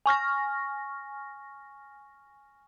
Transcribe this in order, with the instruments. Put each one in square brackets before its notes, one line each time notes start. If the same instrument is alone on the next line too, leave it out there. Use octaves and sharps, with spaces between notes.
[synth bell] G#5 C#6 F6 A#6